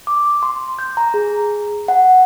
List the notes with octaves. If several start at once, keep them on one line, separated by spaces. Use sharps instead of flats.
D6
C6
G6
A#5
G#4
F#5